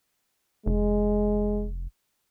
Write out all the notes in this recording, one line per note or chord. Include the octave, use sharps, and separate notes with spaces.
F1 G#3